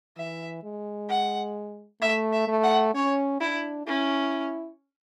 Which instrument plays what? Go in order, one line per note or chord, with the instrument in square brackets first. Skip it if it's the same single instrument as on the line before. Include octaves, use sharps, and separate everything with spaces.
[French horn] E3 [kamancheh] E5
[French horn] G#3
[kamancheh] F#5
[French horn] A3 [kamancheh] E5
[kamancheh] E5
[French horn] A3
[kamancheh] F#5
[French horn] C#4 [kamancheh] C#5
[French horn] D4 [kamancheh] E4
[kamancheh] C#4 [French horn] E4